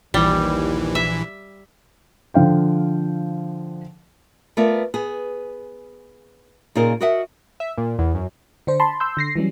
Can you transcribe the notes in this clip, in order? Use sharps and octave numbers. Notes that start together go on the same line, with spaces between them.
A#1 D#2 E3 G3
E5
D3 F3 F5 G5
A3 B3 F4 A#4 D5
B3 G#4
A#2 C#3 D#4 F4 G#4 A#4
F#4 A#4 D#5 E5 F#5
E5
A#2
E2
F#2
D3 D4 C5
A5 B5 C6
C6 E6 G6
D3 A#6 C7
E3 F#3 G3 C#4